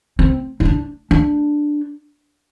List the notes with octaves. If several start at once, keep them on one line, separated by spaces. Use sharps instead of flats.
C4
D#4
D4
D4